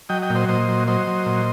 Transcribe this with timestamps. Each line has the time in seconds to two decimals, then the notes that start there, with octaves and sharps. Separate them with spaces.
0.09 F#3 D#5 G5
0.22 D#5 G5
0.30 A#2
0.35 C5 D#5
0.48 A#2 C5 D#5
0.68 F#3
0.87 F#3 C5 D#5
1.07 F#3
1.26 A#2